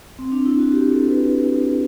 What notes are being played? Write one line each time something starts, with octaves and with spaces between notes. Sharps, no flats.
C4
D4
E4
F#4
G4
A4
B4